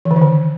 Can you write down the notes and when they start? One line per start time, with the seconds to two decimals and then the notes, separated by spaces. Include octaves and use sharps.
0.05 E3
0.11 D3
0.16 D#3
0.21 D3